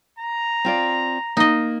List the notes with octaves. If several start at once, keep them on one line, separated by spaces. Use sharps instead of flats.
A#5
C4 F4 D5
A#3 D#4 D#5